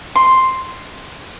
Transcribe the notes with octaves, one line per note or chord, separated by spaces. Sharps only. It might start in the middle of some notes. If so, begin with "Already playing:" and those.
C6